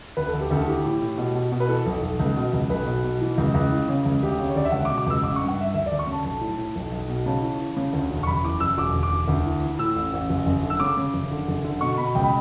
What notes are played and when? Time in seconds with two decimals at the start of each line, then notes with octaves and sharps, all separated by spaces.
0.17 D2 B4
0.28 A4
0.33 D2
0.40 G4
0.51 D2 A4
0.67 E3 G4
0.85 A2
1.02 A2
1.18 B2
1.35 B2
1.52 B2
1.60 B4
1.69 E3 A4
1.86 B1
2.03 B1
2.19 C#2
2.36 B2
2.53 C#2
2.70 B1 B4
2.86 B2
3.04 B2
3.21 E3
3.38 C#2
3.54 C#2
3.71 E3
3.88 C#3
4.05 C#2
4.22 D2 G4
4.39 C#3
4.49 C#5
4.55 D2 D5
4.65 E5
4.72 C#2 F#5
4.85 D6
4.90 B2
4.98 D6
5.06 C#2 E6
5.23 A1 D6
5.36 G2 C#6
5.48 F#5
5.57 G2 E5
5.74 D2 E5
5.86 D5
5.91 D2
5.99 C#6
6.07 C#3
6.12 A5
6.24 B1 A5
6.41 A2
6.58 A2
6.75 B1
6.92 B1
7.09 B2
7.25 C#3 A5
7.42 E3
7.59 E3
7.77 C#3
7.93 D2
8.11 E1
8.23 C#6
8.26 F#1 B5
8.44 E2 D6
8.60 F#1 E6
8.78 E1 D6
8.95 D2
9.03 D6
9.11 E1
9.28 D2
9.45 E3
9.62 E3
9.79 A2 E6
9.96 A1
10.13 A1
10.29 F#1
10.46 F#1
10.63 D3
10.70 E6
10.80 C#3 D6
10.97 C#3
11.13 F#1
11.31 D3
11.48 F#1
11.64 D3
11.81 B2 C#6
11.98 B2 B5
12.15 C#2 G5
12.24 B5